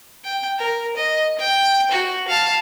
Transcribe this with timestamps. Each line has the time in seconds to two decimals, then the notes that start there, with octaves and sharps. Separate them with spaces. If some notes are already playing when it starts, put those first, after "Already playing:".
0.24 G5
0.58 A#4
0.96 D#5
1.38 G5
1.91 F#4
2.28 F5 A5